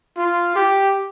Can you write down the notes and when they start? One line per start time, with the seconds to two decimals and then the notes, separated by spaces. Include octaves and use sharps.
0.17 F4
0.56 G4